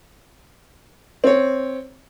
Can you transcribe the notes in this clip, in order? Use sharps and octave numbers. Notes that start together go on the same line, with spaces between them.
C4 C#5